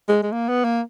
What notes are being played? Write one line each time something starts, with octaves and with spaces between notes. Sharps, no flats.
G#3
G#3
A#3
B3
A#3